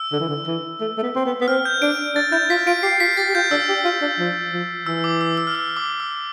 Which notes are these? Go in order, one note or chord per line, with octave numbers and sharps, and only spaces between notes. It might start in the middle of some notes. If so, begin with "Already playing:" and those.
Already playing: E6
D3
E3
D3
E3
A3
A3
B3
C4
B3
B3
C4 F6
G6
D4 D7
D4 A6
E4 G6
F4 B6
F4 D7
G4 C7
F4 B6
G4 A6
G4
F4 G6
D4 E6
G4
F4
D4
F3
F3
E3 E6
D6
E6
E6
F6
E6
D6
E6